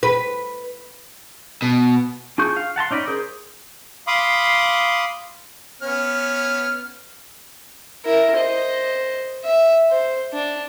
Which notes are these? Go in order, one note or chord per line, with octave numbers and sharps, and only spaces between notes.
B4
B2
D4 F4 G#4 C#6 G6
F5
F#5 A5 A#5 C6
C#4 D#4 D5 D#5 B5
G#4 A#4 C5
F5 B5 C6 D6 D#6
B3 C#4 F6
E4 A#4
C5 D#5
E5
C5
D4